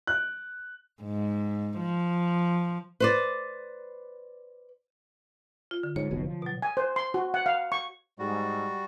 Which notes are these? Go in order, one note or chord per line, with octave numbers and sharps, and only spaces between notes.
F#6
G#2
F3
B4 C5 D5
F4
D3
G#2 C#5
F1 B1 B2
F3
B2 F#3
G#5
C5
C6
F#4
F#5
F5
C#6
G#2 G3 F#4